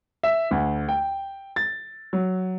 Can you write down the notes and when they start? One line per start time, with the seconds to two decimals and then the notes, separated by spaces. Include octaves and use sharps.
0.23 E5
0.51 D2
0.89 G5
1.56 A6
2.13 F#3